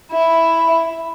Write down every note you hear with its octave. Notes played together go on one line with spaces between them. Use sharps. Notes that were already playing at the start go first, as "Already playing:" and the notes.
E4